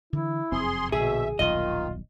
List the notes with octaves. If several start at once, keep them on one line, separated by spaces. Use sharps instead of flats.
D3 E3 E4
F1 F#2 C4 G#4 C6
A#1 B2 D3 G#4 E5
D#1 B1 F#2 D#3 F4 D#5